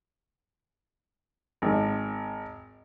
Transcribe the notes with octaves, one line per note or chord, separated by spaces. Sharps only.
G#1